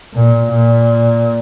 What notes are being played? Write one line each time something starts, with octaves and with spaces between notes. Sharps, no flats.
A#2
A#2